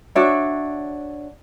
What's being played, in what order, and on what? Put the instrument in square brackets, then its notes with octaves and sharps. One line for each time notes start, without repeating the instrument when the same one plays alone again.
[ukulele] D4 F#4 C#5 E5